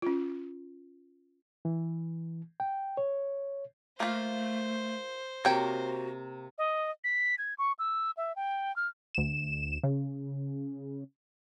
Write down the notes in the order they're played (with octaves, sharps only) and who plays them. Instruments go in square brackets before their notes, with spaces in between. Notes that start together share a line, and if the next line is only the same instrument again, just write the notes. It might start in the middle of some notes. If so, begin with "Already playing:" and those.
[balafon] C#4 F4
[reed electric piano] E3
G5
C#5
[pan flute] A3 [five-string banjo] A#3 F4 [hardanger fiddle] C5
[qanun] C3 A#3 [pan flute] F#4 [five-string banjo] C#5 G5
[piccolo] D#5
B6
G#6
C#6
E6
E5
G5
F6
[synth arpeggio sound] D2 E7
C#3